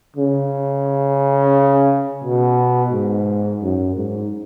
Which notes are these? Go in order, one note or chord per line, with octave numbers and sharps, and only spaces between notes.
C#3
B2
G#2
F#2
G#2